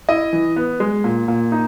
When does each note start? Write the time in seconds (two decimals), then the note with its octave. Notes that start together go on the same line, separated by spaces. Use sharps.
0.09 E4 D#5
0.33 E3
0.56 B3
0.80 G#3
1.04 A#2
1.28 A#2
1.52 D#4